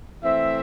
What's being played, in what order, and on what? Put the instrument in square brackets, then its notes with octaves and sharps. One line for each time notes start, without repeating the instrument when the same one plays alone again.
[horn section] E3 A3 C4 E5